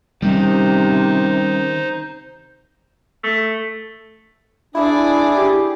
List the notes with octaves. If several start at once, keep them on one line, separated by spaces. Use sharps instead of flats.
C3 D#3 G3 C#4 D#4 C5
A3
D4 E4 G#4 D5
G4